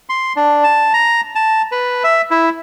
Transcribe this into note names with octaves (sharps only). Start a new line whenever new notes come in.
C6
D4
A5
A#5
A5
B4
E5
E4